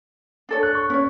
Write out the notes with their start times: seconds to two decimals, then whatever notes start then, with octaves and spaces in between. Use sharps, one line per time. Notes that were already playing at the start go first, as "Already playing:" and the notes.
0.49 D4 A4 C#5
0.63 F#6
0.75 C#6
0.90 C#4 C#5